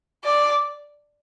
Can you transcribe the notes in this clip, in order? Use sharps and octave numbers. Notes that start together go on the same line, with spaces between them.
D5